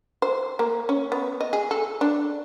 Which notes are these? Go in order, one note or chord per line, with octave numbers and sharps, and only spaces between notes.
C5
A#3
C#4
B3
D#5
G#4
A4
D4